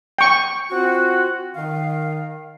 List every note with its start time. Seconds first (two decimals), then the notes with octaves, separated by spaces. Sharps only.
0.18 G5 C#6
0.70 C4 F4 F#4
1.56 D#3 F5